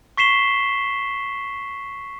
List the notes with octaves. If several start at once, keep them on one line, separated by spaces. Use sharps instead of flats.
C#6 B6 C7 E7 G7